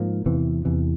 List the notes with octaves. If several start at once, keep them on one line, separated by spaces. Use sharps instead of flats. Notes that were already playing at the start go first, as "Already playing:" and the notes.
Already playing: G#2 F3 A#3
E2 C3 E3
E2 C3 E3